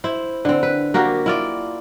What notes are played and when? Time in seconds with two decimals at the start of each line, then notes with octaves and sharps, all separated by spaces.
0.04 E4 C5
0.45 D3 C4
0.63 B4
0.94 A#3 F#4 G4 A#4
1.26 E4 F4 D5